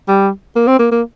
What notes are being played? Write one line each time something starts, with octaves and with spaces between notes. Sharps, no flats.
G3
A#3
C4
A#3
A#3